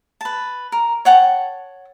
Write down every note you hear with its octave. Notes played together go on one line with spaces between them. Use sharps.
B4 A5
A#4
C#5 F#5 G5 A5